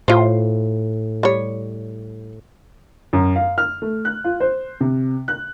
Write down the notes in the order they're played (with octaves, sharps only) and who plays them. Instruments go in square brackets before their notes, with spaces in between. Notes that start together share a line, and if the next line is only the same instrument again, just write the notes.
[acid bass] A2 [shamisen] F4 C5
[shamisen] G3 C#5
[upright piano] F#2
F5
F6
A3
F#6
F4
C5
C3
F#6